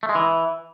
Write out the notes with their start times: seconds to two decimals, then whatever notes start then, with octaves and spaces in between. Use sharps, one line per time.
0.03 A3
0.09 G#3
0.15 E3